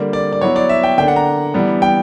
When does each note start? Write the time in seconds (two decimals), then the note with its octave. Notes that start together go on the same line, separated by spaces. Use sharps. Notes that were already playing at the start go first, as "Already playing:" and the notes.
Already playing: D3 G3 A#3
0.13 D5
0.33 D5
0.41 F#3 B3 E4 C#5
0.56 D5
0.69 E5
0.83 G5
0.98 D3 A#3 D4 G5
1.08 F#5
1.16 A#5
1.54 E3 G3 B3 D4
1.82 G5